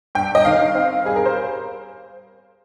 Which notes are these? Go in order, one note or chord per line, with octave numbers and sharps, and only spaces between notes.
G2 G5
D#5
D#3 F5
C4
G3 G#4
A#4
C5